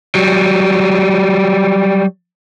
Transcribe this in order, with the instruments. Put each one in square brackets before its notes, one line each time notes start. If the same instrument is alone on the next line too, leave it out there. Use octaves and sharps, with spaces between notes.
[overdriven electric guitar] F#3 G3